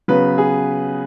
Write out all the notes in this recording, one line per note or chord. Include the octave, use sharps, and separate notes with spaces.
C#3 F#3 B3 B4
G#4